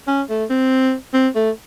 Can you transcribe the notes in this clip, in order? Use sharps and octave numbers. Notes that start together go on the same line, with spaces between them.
C#4
A3
C4
C4
A3